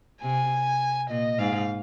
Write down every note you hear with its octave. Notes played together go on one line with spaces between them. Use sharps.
C3 G#5
A#2 D#5
G#2 F5